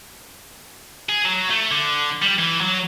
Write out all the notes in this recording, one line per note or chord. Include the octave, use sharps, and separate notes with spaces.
G#4
F#3
A3
D3
G3
E3
F#3